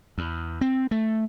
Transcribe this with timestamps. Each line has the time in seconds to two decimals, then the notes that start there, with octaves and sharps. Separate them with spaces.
0.18 E2
0.61 C4
0.91 A3